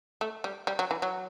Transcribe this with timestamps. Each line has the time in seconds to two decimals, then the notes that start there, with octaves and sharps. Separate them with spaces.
0.21 A3
0.44 G3
0.67 G3
0.79 F#3
0.91 E3
1.02 F#3